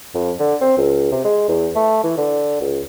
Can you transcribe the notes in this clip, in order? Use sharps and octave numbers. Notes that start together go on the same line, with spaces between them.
F2
D3
C4
C#2
C3
G#3
E2
A3
E3
D3
C#2